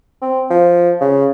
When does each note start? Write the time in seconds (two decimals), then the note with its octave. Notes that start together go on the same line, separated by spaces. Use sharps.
0.22 C4
0.50 F3
1.00 C#3